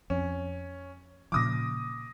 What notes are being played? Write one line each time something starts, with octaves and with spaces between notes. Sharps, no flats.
F2 C#4
A#2 C#3 F3 D6 D#6 A#6